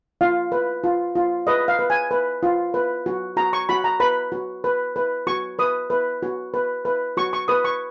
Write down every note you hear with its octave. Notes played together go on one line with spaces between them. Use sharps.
F4 F5
B4
F4
F4
B4 D#5
F5
B4
G#5
B4
F4
B4
F#4
F#4 A#5
C#6
F#4 B5
A#5
B4 B5
F#4
B4
B4
F#4 C#6
B4 D#6
B4
F#4
B4
B4
F#4 C#6
C#6
B4 D#6
C#6